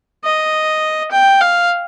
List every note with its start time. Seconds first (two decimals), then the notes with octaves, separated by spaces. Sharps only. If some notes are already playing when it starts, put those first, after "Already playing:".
0.24 D#5
1.12 G5
1.41 F5